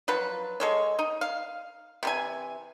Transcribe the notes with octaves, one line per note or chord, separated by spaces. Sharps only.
F3 F#3 B4
G#3 A4 C#5
D#4
F5
C3 E3 G#5